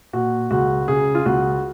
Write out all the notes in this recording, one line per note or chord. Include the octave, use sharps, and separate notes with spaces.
A#2 F#4
C#2 F#4
C#3 G#4
F4
C#2 F#4